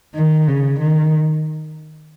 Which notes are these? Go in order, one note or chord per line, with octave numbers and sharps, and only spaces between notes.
D#3
C#3
D#3